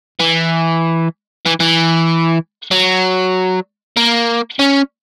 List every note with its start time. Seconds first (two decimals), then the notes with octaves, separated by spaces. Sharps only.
0.20 E3
1.46 E3
1.60 E3
2.71 F#3
3.97 A#3
4.59 C#4